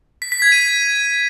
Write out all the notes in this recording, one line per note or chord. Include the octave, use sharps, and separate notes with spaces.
B6
B6
G#6
D#7